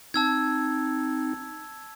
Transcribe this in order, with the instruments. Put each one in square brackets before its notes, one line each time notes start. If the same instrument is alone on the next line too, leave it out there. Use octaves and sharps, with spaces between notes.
[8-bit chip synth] C4 D#4 [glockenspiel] A5 E6 G#6